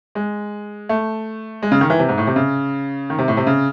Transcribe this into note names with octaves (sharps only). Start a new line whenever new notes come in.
G#3
A3
G#3
C#3
D#3
E3
C3
G#2
A2
C3
C#3
D#3
C3
A2
C3
C#3